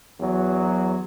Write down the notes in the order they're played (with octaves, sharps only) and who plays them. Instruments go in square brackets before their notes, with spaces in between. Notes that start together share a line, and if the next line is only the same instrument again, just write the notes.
[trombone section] E2 F#3